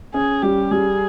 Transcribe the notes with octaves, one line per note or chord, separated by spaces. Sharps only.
C#4 G#4
G3 G4
G3 G#4